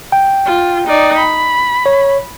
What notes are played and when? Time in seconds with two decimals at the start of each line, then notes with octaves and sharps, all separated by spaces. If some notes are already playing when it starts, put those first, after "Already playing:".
0.12 G5
0.46 F4
0.87 D#4 D5
1.18 B5
1.86 C#5